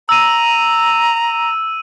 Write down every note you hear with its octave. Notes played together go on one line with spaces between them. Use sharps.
A#5 E6 D#7